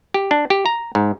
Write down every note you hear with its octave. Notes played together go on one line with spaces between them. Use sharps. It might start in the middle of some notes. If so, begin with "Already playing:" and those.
G4
D4
G4
A#5
G#2